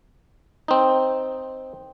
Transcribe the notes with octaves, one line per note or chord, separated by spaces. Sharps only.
C4 D#4